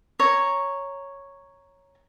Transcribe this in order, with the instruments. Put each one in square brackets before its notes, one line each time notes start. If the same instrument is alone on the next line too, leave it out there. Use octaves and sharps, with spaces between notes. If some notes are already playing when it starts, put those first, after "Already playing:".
[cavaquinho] C#5 A#5